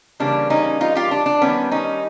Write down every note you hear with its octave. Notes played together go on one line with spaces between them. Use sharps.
C#3 E3 G3 A#3 C#4 D4
C#4 D#4
D#4 F4
F4 G4
D4
D4
D#3 G3 B3 C#4
C#4 D#4